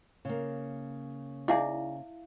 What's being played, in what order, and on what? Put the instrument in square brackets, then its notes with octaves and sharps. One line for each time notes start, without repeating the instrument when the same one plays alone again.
[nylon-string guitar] C#3 A#3
[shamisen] D#4 G#4 D5 [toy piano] E4 E5 F5